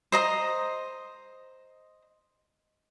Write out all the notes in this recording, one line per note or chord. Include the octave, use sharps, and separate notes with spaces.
C5 D#5 A#5